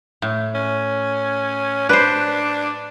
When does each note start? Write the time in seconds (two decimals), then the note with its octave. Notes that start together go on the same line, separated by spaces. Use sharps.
0.22 A2
0.55 C#4
1.89 D4 B4 C5